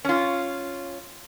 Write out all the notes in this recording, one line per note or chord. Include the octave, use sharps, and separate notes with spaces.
C#4 F4